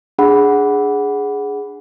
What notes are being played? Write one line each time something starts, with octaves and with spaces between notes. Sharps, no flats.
D4 G#4 F#5 B5